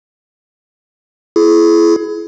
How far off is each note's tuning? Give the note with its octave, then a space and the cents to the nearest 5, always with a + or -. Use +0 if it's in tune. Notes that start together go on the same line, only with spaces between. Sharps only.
E4 +25 G#4 +35